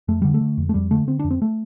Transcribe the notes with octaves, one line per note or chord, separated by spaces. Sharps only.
F2 A3
D3 G3
A3
D3
F2
A3
F2 G3
D3 A3
D3 C4
D4
F2
C4
A3